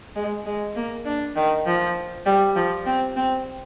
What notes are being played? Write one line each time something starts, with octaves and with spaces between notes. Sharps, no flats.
G#3
G#3
A#3
D4
D#3
F3
G3
F3
C4
C4